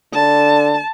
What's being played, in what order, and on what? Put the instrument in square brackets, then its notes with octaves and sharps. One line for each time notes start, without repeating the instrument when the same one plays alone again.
[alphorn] D3 [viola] A5